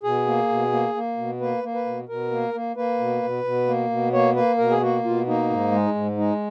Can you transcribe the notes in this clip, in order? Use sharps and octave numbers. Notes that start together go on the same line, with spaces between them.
B2 G#4
A#3
B2
A#3
A#3
B2
A#3 B4
A#3
B4
B2
B2 A#4
A#3
A#3
A#3 B4
B2
B2
B2
A#3
B2
A#3 C#5
A#3 B4
B2 A#4
G#4
A#3 F#4
B2 F4
A#3 D#4
G#2
G#3
G#2
G#3 D#4